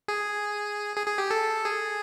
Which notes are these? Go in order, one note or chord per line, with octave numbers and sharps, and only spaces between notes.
G#4
G#4
G#4
G4
A4
G#4